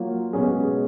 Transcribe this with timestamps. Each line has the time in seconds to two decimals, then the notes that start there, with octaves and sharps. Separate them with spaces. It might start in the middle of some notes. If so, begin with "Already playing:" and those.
Already playing: F#3 A#3 F4
0.33 B2 G#3 C#4 G#4